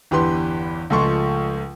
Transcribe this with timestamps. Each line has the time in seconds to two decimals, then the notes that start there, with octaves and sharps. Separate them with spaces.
0.11 G1 E2 G4 B4 C6
0.90 C#2 F3 G#3 A3 C6 C#6